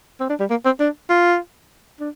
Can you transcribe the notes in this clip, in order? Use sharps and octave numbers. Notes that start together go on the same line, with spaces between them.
C4
D4
G3
A#3
C4
D4
F4
D4